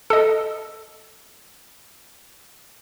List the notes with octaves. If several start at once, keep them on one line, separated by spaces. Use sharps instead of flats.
A4 D#5